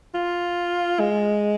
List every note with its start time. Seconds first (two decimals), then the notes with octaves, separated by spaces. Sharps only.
0.14 F4
1.00 G#3